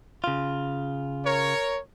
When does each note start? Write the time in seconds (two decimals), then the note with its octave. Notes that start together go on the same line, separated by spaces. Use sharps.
0.24 C#3 F4
1.26 A#4 C#5